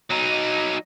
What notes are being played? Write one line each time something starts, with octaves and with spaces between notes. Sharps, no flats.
F#3 D#4